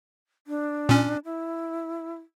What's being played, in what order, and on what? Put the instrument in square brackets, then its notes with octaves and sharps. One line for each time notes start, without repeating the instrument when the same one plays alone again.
[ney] D4
[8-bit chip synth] A#2 C#4
[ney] E4